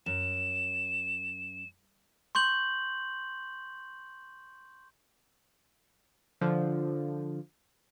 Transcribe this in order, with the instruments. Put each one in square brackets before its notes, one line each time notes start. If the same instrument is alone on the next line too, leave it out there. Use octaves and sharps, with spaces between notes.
[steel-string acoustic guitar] F#2 [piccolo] E7
[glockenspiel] C6 C#6 G6 F#7
[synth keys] D3 F3